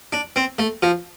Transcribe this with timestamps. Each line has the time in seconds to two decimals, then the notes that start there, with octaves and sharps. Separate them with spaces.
0.13 D4
0.36 C4
0.59 A3
0.83 F3